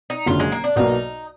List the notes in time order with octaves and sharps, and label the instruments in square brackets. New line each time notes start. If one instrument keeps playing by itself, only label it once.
[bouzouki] D#4
[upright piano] F#1 F#2 D3 [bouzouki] F4
[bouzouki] G#3
A#3
D4
[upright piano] B1 B2 A#3 [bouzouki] D#4